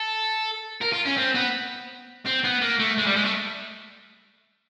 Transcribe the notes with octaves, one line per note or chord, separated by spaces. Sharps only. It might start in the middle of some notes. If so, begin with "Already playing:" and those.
Already playing: A4
A#4
F4
C#4
C4
B3
C4
B3
A#3
A3
G#3
G3
G#3
A3